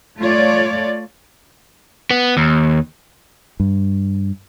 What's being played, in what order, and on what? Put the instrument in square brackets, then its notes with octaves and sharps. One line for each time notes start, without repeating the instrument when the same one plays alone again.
[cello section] A3 F4 C#5 D5
[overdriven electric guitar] B3
D#2
[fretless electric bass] G2